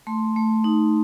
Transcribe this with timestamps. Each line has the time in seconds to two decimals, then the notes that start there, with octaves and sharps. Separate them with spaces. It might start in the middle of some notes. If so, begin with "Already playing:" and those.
0.07 A3 C6
0.36 A3
0.64 D#4